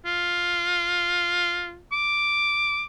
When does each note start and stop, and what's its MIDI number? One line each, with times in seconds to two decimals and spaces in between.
0.06 1.79 65
1.92 2.83 86